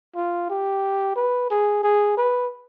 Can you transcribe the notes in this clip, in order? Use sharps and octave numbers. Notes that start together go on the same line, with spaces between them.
F4
G4
B4
G#4
G#4
B4